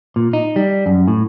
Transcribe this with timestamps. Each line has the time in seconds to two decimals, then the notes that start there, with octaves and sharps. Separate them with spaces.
0.16 A#2
0.33 D#4
0.56 G3
0.86 F#2
1.08 A2